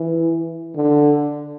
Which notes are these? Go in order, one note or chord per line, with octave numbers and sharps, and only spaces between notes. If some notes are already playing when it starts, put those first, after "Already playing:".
Already playing: E3
D3